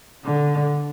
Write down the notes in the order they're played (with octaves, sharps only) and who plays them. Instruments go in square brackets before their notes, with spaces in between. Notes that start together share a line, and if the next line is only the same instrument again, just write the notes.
[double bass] D3